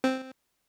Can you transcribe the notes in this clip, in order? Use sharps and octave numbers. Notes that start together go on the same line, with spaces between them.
C4